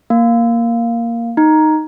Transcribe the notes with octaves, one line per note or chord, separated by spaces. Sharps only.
A#3
D#4